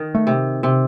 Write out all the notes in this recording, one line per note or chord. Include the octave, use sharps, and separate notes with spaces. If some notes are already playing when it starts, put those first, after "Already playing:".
Already playing: D#3
A3
C3
C3